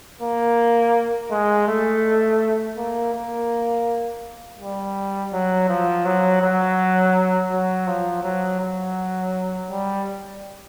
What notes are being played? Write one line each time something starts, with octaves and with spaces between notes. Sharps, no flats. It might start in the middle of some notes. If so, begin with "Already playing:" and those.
A#3
G#3
A3
A#3
A#3
G3
F#3
F3
F#3
F#3
F#3
F3
F#3
F#3
G3